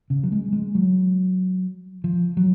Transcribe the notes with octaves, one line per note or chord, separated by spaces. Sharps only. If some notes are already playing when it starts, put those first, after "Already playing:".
C#3
F#3
G#3
G#3
F#3
F3
F#3